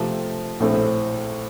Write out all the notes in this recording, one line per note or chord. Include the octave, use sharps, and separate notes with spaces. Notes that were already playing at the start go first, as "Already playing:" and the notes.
Already playing: C3 F3 A3 C4 G4
A#1 A2 A3 C4